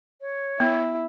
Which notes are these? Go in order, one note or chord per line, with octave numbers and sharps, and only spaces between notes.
C#5
B3 E4